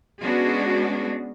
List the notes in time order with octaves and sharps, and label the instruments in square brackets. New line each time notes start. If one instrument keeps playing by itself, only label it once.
[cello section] G#3 B3 C#4 D4 F#4 G#4